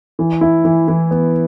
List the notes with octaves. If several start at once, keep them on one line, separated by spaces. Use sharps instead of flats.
E3
E4
E3
E3
B3